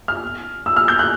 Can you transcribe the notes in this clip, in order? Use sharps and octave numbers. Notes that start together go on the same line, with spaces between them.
F6
E6
F6
G6
F#6